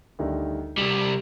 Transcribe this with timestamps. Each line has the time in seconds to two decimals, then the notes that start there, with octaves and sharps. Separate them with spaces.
0.19 D2 D#3 G3
0.78 C2 G3 E7